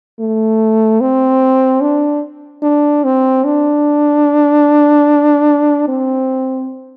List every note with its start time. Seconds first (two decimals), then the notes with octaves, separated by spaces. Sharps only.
0.19 A3
1.01 C4
1.81 D4
2.63 D4
3.04 C4
3.44 D4
5.88 C4